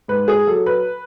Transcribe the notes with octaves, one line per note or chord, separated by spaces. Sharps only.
G#2 B4
G#4
F#3 A4
B4